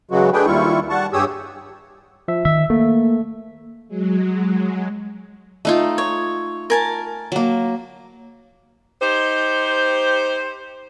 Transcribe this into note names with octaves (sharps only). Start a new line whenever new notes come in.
C#3 E3 F#3 G#3 F#4
A3 D4 G#4 B4 G5
D#2 G3 E4 F4 C#6
G3 F#5 A5 C#6
G2 G4 G#4 C#5 D#6 E6
F3 E5
D#3 E5
A3 A#3
F#3 G#3
A3 D#4 F4
C#5
A#4 G#5 A5
F#3 A#3
D#4 G4 C5